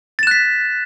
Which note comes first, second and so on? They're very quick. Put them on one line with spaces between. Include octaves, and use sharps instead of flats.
A6 E7 F#6 B6